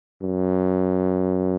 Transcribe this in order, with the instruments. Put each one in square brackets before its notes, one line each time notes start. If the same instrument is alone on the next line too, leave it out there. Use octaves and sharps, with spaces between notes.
[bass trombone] F#2